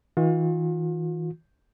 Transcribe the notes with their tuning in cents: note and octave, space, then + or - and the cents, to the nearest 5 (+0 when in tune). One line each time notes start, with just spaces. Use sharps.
E3 -40 F4 +40